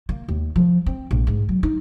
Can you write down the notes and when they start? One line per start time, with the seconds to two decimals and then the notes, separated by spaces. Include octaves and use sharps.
0.09 A#3
0.28 D#2
0.56 F3
0.86 C4
1.11 A#1
1.27 G#2
1.49 F#3
1.63 D#4